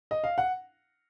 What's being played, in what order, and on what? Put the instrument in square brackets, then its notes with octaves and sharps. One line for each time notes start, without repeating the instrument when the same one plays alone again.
[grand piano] D#5
F5
F#5